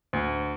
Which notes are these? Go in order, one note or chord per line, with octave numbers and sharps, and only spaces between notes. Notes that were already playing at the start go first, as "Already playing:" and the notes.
D2